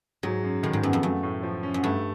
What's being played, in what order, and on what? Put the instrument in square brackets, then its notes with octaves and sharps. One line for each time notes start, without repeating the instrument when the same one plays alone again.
[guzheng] G#2 [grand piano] F#3
[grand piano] F#2
[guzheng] A2 [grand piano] D#3
[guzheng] G#2
[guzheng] F#2 [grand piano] B3
[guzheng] F2
[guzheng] F#2 [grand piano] A3
[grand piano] A2
F3
C#4
[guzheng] F#2
[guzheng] G2 [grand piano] A3